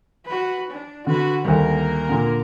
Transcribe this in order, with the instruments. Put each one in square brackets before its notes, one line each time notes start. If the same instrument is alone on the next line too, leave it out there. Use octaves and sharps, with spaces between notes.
[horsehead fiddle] F#4 B4
D4
[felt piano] D3 [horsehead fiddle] F#4 B4
[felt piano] D2 D#3 G3 [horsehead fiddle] A#3 A#4
[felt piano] A#2 D3